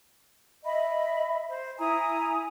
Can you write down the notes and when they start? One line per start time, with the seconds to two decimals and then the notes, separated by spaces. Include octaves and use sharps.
0.64 D#5 E5 B5
1.50 C5
1.78 E4 G#5 A#5 D#6